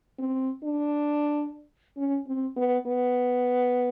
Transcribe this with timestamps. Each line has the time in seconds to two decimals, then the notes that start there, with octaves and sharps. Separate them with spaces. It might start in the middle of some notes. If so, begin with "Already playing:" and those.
0.19 C4
0.63 D4
1.97 C#4
2.27 C4
2.56 B3
2.87 B3